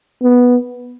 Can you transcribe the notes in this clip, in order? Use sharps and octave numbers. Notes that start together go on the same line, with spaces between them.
B3